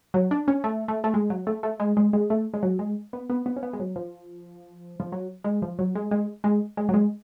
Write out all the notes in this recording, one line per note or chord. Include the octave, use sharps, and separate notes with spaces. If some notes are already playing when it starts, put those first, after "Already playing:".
F#3
D4
C#4
A3
A3
A3
G#3
F#3
A3
A3
G#3
G#3
G#3
A3
G#3
F#3
G#3
B3
B3
B3
C#4
B3
G#3
F#3
F3
F3
F#3
G#3
F3
F#3
G#3
G#3
G#3
G#3
F#3
G#3